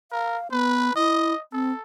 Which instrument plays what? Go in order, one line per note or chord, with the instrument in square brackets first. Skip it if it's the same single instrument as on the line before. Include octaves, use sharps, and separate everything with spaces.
[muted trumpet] A#4 [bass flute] F5
[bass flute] B3 [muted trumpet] B4
[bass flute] E4 [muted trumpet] D#5
[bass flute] C4 [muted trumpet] A4